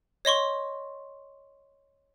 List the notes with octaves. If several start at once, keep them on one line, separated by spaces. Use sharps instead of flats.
C#5 D#5 C6 C#6